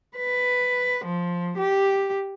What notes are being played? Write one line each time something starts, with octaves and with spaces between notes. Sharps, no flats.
B4
F3
G4